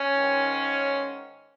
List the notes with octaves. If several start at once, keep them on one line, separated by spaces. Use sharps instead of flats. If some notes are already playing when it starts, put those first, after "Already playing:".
Already playing: C#4
G#2 D#3